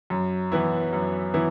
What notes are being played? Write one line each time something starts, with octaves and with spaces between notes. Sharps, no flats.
F#2
E3 B3 E4
F#2
E3 B3 E4